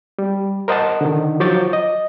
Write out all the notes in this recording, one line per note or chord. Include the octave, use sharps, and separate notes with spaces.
G3
A#4 C5 D#5 F#5 A5
D3 D#3
F3 F#3 C#6 D6 G6 A6
D#5